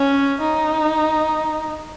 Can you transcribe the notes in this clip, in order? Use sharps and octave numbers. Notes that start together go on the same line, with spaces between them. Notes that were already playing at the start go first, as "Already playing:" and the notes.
Already playing: C#4
D#4